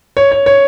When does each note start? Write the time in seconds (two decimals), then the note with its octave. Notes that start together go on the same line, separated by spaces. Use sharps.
0.17 C#5
0.32 C#5
0.46 C#5